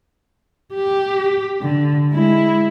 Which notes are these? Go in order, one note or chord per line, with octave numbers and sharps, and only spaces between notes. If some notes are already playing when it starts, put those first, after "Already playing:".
G4
D3
G#3 E4